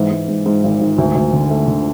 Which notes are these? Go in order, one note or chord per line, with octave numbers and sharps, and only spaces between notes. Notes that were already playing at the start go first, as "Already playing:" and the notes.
Already playing: G#2 E3
G#2
G#2
G#2
G#1
G#1
D2
D2
D3
A3
D3